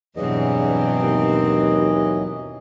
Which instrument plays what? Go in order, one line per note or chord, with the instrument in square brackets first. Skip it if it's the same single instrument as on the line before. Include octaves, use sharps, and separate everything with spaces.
[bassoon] E2 [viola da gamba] G2 B2 C4 [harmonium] E3 F#3 D#5
[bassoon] D#2